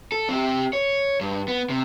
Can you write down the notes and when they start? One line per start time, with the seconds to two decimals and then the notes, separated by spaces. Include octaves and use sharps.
0.12 A4
0.29 C4 G4
0.73 C#5
1.21 G2
1.48 B3
1.70 C3